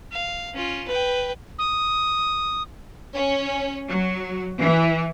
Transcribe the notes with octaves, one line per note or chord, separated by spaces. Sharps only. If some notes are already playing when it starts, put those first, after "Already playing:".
F5
C#4 F4
B4 G5
D#6
C#4
F#3
E3